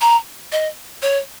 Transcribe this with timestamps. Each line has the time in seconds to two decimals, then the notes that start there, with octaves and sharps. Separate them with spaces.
0.01 A#5
0.52 D#5
1.02 C#5